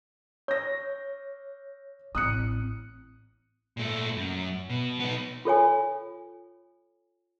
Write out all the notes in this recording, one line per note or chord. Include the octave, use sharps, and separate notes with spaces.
C#5 G6 A#6
A1 C4 D#6 F#6 C#7
A#2 A3
F#2
B2
B3 D#4
F4 A4 C#5 G#5